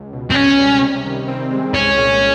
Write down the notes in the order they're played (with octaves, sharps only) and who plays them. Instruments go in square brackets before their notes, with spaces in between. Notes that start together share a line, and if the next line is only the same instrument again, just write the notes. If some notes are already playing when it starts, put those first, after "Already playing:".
Already playing: [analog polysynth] C#2
B2
[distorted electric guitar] C4
[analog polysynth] C#2 [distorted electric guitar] C#4
[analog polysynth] G3
C3
D#3
C4
G#3
[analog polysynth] C2 [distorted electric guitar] C#4
[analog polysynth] A#2